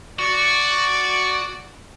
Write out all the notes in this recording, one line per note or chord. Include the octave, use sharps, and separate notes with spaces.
F#4 D5 C#6